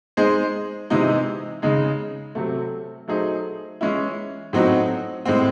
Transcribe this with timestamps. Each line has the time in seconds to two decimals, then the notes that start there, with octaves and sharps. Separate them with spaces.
0.17 G#3 D#4 G#4 C5
0.90 C3 E3 G#3 D#4
1.62 C#3 G#3 D#4 G#4
2.35 C3 F#3 A3
3.08 F#3 A3 D#4 G#4 C5
3.81 E3 G#3 C#4 E4
4.53 A2 F#3 C4 D#4 F#4
5.25 A2 G#3 C4